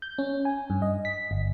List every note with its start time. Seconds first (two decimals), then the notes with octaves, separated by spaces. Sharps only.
0.02 G6
0.18 C#4
0.45 G#5
0.70 G2
0.82 D#5
1.05 B6
1.31 G1